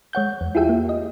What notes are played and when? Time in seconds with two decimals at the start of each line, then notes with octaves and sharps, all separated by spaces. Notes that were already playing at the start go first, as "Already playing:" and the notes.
0.13 G#3 C#5 F#5 G6
0.41 E2
0.55 E4 F4 G4 G#4 E5 G5
0.69 A#3
0.89 D#5